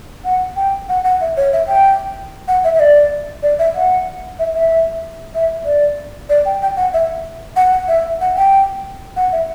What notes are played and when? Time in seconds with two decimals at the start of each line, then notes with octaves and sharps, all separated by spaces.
0.25 F#5
0.56 G5
0.89 F#5
1.05 F#5
1.21 E5
1.37 C#5
1.53 E5
1.68 G5
2.48 F#5
2.64 E5
2.75 E5
2.80 D5
3.43 D5
3.59 E5
3.75 F#5
4.39 E5
4.54 E5
5.35 E5
5.65 D5
6.29 D5
6.45 G5
6.62 G5
6.77 F#5
6.94 E5
7.56 F#5
7.72 F#5
7.88 E5
8.21 F#5
8.37 G5
9.16 F#5
9.32 E5